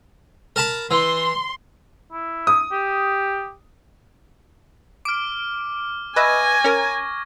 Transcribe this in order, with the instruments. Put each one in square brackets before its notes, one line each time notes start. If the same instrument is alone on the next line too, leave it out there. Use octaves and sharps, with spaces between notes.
[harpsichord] A#4 A5 B5
[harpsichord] E3 [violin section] C6
[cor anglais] E4
[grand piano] D#6
[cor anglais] G4
[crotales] D6 F6 [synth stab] D7
[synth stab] B4 D#5 E5 [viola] G#5 [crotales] C#6 G#6 A#6
[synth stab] C#4 A#4